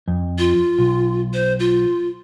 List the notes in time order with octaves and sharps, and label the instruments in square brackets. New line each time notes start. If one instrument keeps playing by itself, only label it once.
[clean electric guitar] F2
[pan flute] F4
[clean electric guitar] B1
[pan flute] C5
F4